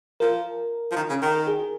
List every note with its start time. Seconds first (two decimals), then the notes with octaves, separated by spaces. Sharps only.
0.20 F3 A#4
0.91 F3
0.96 D#3
1.09 C#3
1.22 D#3
1.35 A#4
1.47 G#4
1.59 G#4